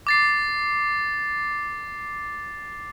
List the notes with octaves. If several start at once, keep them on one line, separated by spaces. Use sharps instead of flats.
D6 A6 C7